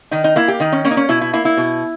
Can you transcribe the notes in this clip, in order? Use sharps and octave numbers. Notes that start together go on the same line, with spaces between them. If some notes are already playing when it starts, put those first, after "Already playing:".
D#3 D#4
D#4
A#3 E4
G4
D#3 D#4
C#4
A#3 C#4
D#4
C#4
B2 E4
E4
A#3 E4
E4
B2